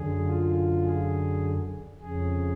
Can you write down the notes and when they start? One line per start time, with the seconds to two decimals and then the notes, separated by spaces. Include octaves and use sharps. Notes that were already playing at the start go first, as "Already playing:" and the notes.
Already playing: F#2 D3 G#4
0.26 F4
0.84 G#4
2.01 F2 C#3 G#4